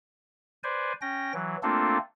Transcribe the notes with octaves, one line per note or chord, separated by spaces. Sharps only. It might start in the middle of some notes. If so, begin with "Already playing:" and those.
B4 C5 D5 G#5
C#4 G5 A#6
E3 F#3
A3 A#3 C4 D4 F4 A4